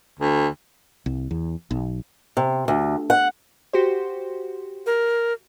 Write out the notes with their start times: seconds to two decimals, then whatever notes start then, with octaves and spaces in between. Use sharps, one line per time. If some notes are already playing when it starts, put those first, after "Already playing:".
0.19 D2
1.06 C2
1.31 E2
1.71 B1
2.37 C3
2.68 D2
3.10 F#5
3.73 F#4 G4 C5
4.86 A#4